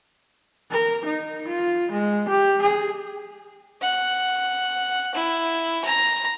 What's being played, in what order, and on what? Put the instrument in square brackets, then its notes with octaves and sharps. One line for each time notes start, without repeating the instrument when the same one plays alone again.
[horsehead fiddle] A#4
D#4
F4
G#3
G4
G#4
[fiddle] F#5
E4
A#5